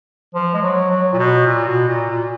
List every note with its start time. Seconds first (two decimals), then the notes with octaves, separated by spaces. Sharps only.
0.35 F3
0.54 G#3
0.62 F#3
0.91 F#3
1.14 A#2
1.18 B2
1.46 A#2
1.67 B2
1.88 A#2
2.10 A#2